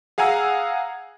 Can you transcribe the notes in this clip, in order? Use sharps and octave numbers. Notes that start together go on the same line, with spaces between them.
G#4 F5 F#5 G#5 A#5 E6